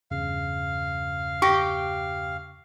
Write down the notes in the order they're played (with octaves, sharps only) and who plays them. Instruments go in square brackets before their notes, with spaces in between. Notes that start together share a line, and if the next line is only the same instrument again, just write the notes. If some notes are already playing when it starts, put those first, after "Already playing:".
[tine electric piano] E2 G2 C#3 [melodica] F5
[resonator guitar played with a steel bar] G4 [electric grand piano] C#6 A#6